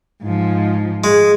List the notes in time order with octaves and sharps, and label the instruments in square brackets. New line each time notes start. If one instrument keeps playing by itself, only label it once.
[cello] G#2 F3
[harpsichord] G#3